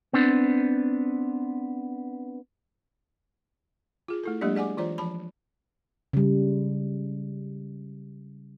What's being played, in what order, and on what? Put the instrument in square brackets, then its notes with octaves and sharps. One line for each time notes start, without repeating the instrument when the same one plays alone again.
[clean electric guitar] B3 C4 D4
[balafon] F4 G#4
A3 E4 A4
F#3 G#3 A#3 D4 G4 D5
G#4 D5 F#5 G#5 D6
E3 F4 C5 D5 A#5
F3 A5 B5
[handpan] C#3 G3